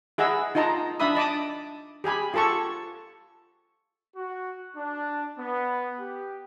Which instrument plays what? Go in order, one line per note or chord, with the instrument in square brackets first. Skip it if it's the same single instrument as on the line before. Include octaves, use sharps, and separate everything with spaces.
[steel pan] E4 G#4 D#5 F#5 E6
D#4 F4 D#5 A5 A#5
D4 E4 E5 B5 D#6
D#5 A5 D6 D#6
G4 G#4 G#5 B5
F4 G4 A4 A5 C#6
[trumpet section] F#4
D4
B3
G4